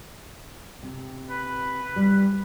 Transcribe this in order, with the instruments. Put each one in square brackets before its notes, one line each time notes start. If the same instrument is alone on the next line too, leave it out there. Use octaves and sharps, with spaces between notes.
[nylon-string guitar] C3
[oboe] B4
[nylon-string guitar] G3